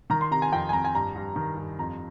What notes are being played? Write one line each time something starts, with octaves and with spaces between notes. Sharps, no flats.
D#3 A#5
C6
C3 A#5
G#5
F2 G5
G#5
F2 A#5
G#5
G2 A#5
G2
D#3
G2
F2 A#5